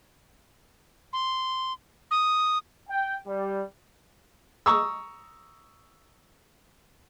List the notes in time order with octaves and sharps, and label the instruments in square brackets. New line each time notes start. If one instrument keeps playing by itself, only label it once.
[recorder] C6
D#6
[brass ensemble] G5
G3
[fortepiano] A#5 C#6 D#6 E6